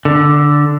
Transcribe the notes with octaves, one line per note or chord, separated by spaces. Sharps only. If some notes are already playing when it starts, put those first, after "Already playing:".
D3